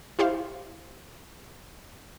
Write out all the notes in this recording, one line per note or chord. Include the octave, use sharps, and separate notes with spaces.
E4 G4 C5 F5